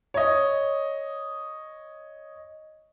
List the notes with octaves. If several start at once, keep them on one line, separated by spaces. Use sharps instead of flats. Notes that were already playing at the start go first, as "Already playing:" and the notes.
C#5 D#5